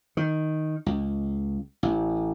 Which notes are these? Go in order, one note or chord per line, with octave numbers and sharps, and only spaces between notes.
D#3
C#2
A1